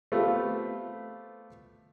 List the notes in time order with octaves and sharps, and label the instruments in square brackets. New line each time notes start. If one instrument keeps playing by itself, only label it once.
[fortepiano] A3 B3 C4 F4 G4